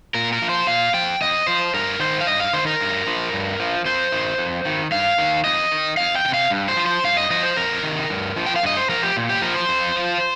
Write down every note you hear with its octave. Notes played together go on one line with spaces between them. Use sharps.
A#2 A#4
A#4
F3
C5
A#2 F5
F3 G5
F2 D#5
F3 C5
G2 A#4
D#3 C5
F5
G2 D#5
F5
D#3 C5
A#4
G2
F3
G2
F3
F2 C5
D#3
F2
D#3
G2 F5
D#3
F2 D#5
D#3
F2 F5
G5
D#3
C3
F5
G2
C5
F3
C5
G2 F5
D#5
F3 D#5
C5
F2 A#4
C3 D#3
G2
F3
G5
F5
G2 D#5
C5
F3 A#4
G4
A#2
G4
F3 A#4
C5
F2
F3